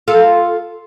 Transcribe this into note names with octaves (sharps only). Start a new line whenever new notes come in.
F4 A4